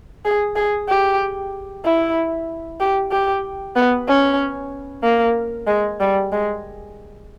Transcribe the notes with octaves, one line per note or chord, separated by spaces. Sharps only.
G#4
G#4
G4
E4
G4
G4
B3
C#4
A#3
G#3
G3
G#3